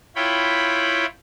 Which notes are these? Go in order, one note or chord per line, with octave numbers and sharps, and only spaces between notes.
E4 F4 C#5 G5 B5